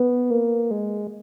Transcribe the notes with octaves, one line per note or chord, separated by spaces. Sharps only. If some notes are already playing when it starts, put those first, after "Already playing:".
Already playing: B3
A#3
G#3